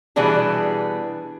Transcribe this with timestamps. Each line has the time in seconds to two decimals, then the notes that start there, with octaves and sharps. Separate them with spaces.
0.16 B2 E3 G3 B3 D4 G#4